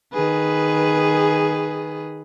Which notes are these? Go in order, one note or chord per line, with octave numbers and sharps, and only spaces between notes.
D#3 G#4 B4